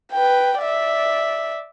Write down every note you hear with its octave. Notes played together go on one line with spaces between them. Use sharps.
B4 G5
D5 E5